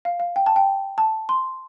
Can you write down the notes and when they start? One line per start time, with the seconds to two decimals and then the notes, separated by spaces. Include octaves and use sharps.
0.05 F5
0.20 F5
0.36 G5
0.46 A5
0.56 G5
0.98 A5
1.29 C6